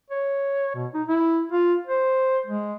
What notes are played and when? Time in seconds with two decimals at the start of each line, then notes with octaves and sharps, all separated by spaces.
0.10 C#5
0.75 B2
0.94 D#4
1.08 E4
1.52 F4
1.87 C5
2.46 G#3